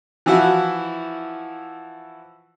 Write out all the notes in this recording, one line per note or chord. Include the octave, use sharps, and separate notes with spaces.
E3 F3 E4 F#4